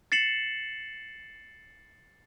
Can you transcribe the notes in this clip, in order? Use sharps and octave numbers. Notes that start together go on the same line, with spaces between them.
A6 C7 C#7 E7 F#7